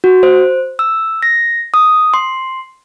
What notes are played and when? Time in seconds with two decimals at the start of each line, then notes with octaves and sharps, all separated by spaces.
0.04 F#4
0.23 C5
0.79 E6
1.23 A#6
1.74 D#6
2.14 C6